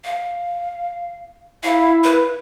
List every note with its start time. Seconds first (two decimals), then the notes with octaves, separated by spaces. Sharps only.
0.04 F5
1.63 E4 F5
2.04 B4